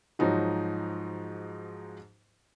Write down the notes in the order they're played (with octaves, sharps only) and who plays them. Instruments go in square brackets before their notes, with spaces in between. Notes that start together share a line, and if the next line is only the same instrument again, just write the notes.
[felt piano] G#2 F3 F#3 D#4 F#4